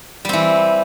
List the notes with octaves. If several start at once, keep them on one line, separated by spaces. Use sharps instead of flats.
E3 G3 C4